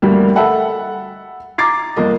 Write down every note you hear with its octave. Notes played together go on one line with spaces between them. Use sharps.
D2 G2 G3 A#3
A4 E5 F#5 B5
A#5 D6 A6 C7
G1 A#3 D#5